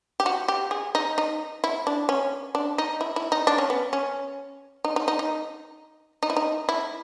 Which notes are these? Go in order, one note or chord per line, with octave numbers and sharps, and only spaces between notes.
G4
F#4
G4
G#4
D#4
D#4
E4
D4
C#4
D4
D#4
E4
E4
D#4
D4
C#4
B3
C#4
D#4
D#4
D#4
D#4
D#4
E4
D#4
E4